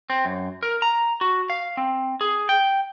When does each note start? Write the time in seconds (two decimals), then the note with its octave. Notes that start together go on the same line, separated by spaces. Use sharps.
0.10 C4
0.25 F#2
0.63 A#4
0.82 A#5
1.21 F#4
1.50 F5
1.77 C4
2.21 G#4
2.49 G5